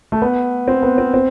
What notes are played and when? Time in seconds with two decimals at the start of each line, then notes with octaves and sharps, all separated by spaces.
0.12 A3
0.22 B3
0.68 C4
0.83 B3
0.98 C4
1.14 C4